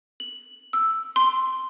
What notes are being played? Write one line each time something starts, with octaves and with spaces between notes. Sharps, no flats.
F#7
E6
C6